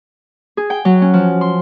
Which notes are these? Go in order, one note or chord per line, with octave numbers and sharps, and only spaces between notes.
G#4
G5
F#3
C#4
F3
C6